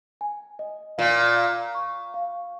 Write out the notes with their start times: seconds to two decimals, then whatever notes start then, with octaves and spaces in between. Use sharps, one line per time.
0.21 G#5
0.59 D#5
0.98 A#2 F5
1.36 F5
1.75 C#6
2.14 F5